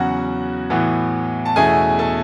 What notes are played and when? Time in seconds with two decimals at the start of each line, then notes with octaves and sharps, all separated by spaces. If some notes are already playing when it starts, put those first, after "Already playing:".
Already playing: E2 C#3 F#3 C#4 F#4 F#5
0.70 A2 E3 B3
1.45 A5
1.56 E2 B2 A3 C#4 E4 G#4 G#5
1.99 A4 A5